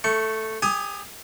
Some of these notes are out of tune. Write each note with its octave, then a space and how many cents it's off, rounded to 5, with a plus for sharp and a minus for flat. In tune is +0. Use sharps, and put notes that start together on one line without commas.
A3 +0 C#6 +10
G4 +35 G#5 +15 D#6 +15